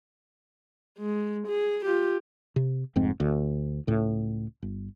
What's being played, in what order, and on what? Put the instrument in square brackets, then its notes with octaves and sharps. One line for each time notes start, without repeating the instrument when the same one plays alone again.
[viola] G#3
G#4
F4 G4
[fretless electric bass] C3
F1 F2 G#2 C4
D2
C#2 A2
G1